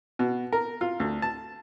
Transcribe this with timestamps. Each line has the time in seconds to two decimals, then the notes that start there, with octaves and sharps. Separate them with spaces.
0.19 B2
0.53 A#4
0.81 F4
1.00 D2
1.22 A5